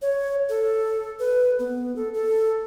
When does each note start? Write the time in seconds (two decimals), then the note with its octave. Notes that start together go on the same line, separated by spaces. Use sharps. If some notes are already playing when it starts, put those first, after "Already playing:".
0.02 C#5
0.49 A4
1.19 B4
1.59 B3
1.96 A4
2.14 A4